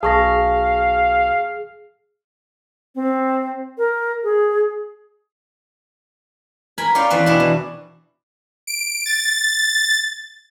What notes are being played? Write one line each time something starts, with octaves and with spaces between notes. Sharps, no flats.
B1 G#4 F5 A5 C#6 A#6
C4
A#4
G#4
A#4 G#5 B5
C#4 F4 D5 F5 G5
E2 C4 B4
B2 D4 E4
E3
D7
A6